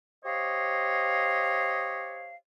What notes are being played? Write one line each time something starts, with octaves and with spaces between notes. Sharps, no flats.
G4 C5 C#5 D#5 F5